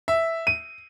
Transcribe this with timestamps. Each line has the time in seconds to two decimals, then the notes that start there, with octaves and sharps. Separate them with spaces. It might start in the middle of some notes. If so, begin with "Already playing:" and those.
0.08 E5
0.47 D#7